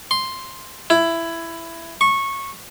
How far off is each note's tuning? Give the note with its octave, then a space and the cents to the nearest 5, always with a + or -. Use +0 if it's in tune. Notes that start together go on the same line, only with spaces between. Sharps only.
C6 +5
E4 +15
C#6 -15